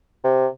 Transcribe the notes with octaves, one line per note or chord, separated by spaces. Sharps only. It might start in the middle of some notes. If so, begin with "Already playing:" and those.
C3